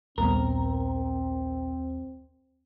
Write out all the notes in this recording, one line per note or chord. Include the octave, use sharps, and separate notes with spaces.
A#1 D#2 G3 B3 C4 A#4